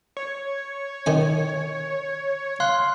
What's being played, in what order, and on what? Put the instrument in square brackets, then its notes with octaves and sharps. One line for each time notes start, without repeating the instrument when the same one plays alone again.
[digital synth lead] C#5
[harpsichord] D#3 G#5
[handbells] F5 C6 F#6